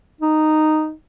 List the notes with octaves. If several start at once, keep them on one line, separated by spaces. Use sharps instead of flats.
D#4